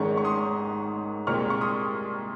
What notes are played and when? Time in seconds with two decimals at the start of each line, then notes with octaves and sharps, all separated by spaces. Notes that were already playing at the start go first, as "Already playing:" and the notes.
Already playing: G#1 G#2 D#3 G#3 C#4 C#6
0.17 C#6
0.25 C6 D#6
1.27 C2 A#2 G#3 C4 C#6 F6
1.50 C#6
1.61 C6 D#6